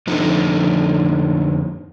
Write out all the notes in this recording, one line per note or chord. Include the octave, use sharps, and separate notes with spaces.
F2 D3 F3 D#4